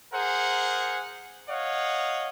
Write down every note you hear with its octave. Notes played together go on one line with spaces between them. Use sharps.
G#4 A#4 C5 F#5
C#5 D#5 F5 F#5